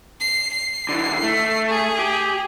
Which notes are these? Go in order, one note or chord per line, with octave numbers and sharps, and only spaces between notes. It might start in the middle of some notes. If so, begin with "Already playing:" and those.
C7
C7
D3 E3
A3
G#4
G4